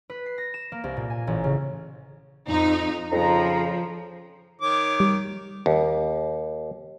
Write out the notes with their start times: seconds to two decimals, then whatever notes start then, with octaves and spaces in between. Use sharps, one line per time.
0.10 B4
0.26 C7
0.38 A#6
0.54 E7
0.72 A#3
0.84 C2
0.97 A#2
1.10 G#5
1.27 A1
1.44 C#3
2.48 F2 D#4
3.12 F2 C#3 F3 A#5
4.62 D#3 C#5 D6
5.00 G3
5.66 D#2